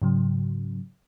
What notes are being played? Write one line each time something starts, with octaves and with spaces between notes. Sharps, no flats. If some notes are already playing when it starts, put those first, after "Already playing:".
G#2 C#3 F#3